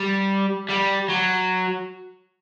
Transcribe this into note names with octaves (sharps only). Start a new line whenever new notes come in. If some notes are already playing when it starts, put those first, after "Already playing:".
Already playing: G3
G3
F#3